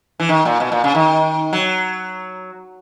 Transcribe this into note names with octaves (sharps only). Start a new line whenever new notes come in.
E3
D#3
A#2
B2
A#2
C#3
D#3
F#3